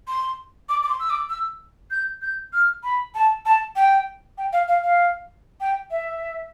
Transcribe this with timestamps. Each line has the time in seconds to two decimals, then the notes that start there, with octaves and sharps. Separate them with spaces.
0.08 C6
0.69 D6
0.83 D6
0.89 C6
1.00 E6
1.10 D6
1.29 E6
1.91 G6
2.22 G6
2.53 F6
2.83 B5
3.15 A5
3.45 A5
3.76 G5
4.38 G5
4.53 F5
4.68 F5
4.83 F5
5.60 G5
5.91 E5